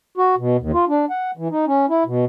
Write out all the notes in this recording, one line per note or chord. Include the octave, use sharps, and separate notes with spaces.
F#4
B2
D#2
F4
D4
F#5
E3
D#4
C#4
E4
B2